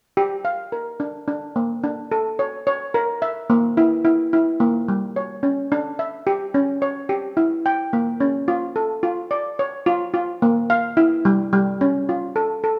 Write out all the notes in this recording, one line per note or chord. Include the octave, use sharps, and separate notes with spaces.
G4
F5
A#4
D4
D4
A#3
D4
A4
C#5
C#5
A#4
E5
A#3
E4
E4
E4
A#3
G3
C#5
C#4
D4
E5
G4
C#4
C#5
G4
E4
G5
A#3
C#4
F4
A4
F4
D5
C#5
F4
F4
A#3
F5
E4
G3
G3
C#4
F4
A4
A4